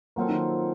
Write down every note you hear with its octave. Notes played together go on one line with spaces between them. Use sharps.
F3 F#3 A#3 C4 F4 A4
D#3